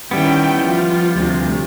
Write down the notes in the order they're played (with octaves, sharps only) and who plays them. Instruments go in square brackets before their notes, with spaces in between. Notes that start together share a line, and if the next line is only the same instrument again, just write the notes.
[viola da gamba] D#3 C#4 E4 [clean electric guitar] G3 B3 [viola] G5
[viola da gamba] F3 [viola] F4
[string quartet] D2 C3